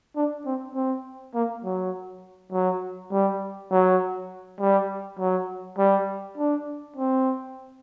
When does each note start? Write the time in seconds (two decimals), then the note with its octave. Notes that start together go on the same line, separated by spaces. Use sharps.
0.16 D4
0.46 C4
0.75 C4
1.34 A#3
1.64 F#3
2.52 F#3
3.12 G3
3.71 F#3
4.60 G3
5.19 F#3
5.78 G3
6.38 D4
6.96 C4